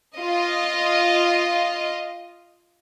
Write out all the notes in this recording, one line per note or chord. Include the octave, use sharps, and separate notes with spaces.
F4 D#5